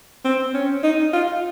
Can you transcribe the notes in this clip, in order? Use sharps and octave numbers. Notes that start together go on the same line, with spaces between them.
C4
C#4
D#4
F4